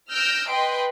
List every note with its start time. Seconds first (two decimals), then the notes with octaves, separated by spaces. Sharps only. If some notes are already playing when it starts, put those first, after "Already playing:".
0.11 E6 F6 G6 A#6 D7
0.51 B4 D#5 G5 C6